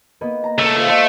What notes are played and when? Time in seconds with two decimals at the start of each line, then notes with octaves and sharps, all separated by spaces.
0.21 A#3 B3 D#5
0.44 A#5
0.58 C#2 A3
0.78 F4 C5
0.90 A3 D#5